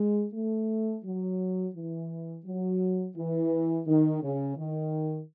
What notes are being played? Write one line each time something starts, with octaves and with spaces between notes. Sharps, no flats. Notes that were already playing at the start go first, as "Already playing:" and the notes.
Already playing: G#3
A3
F#3
E3
F#3
E3
D#3
C#3
D#3